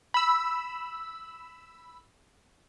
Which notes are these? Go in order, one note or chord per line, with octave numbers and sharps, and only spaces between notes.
B5 E6